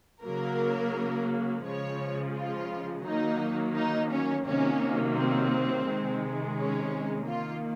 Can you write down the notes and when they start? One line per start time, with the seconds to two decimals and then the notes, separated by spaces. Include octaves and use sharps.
0.24 C#3 F#3 A#3 A#4
1.65 C#3 F3 G#3 C#5
2.35 F4
3.05 D#3 F#3 A#3 D#4
3.76 D#4
4.10 C#4
4.46 C3 D#3 F#3 A#3 C#4
5.16 C4
5.86 C3 D#3 G#3
6.56 C#4
7.27 D#3 A#3 F4